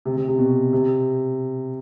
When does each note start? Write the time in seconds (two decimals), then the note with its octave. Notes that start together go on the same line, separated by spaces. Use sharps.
0.05 C3
0.16 C3
0.28 C3
0.39 B2
0.73 C3